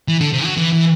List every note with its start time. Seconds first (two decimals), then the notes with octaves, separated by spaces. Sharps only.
0.08 E3
0.21 D3
0.33 C3
0.44 F#3
0.57 E3
0.73 E3